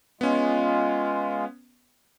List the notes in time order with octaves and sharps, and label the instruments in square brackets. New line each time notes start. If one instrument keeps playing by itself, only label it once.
[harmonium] G#3 F4 [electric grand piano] B3 C#4